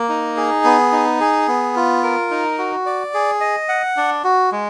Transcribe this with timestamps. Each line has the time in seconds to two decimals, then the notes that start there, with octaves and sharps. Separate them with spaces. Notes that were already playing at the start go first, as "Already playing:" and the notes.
Already playing: A#3
0.09 D#4
0.37 G#4
0.64 B3
0.92 D#4
1.20 G#4
1.48 B3
1.76 F4
2.03 A#4
2.31 D#4
2.58 F#4
2.86 D5
3.14 G#4
3.41 D#5
3.69 F#5
3.97 D4
4.24 F#4
4.52 G#3